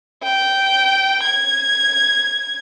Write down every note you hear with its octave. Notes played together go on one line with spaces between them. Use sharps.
G5
G#6